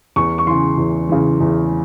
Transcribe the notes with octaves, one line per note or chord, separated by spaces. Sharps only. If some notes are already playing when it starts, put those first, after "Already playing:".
E2 C#6
C#6
C#3 E3 C6
E2
C#3 E3
E2